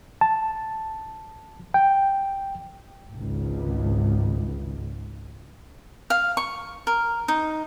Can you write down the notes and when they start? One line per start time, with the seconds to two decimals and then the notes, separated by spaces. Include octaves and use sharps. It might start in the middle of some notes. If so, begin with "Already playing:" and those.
0.21 A5
1.74 G5
3.12 G#1 C#2
6.10 F5
6.37 C#6
6.87 A#4
7.28 D#4